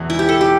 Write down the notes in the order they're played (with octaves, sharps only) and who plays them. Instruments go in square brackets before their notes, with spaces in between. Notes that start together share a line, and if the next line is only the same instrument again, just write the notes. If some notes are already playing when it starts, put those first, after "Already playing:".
Already playing: [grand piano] E1 E2 E3
[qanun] E4
G4
A4
G4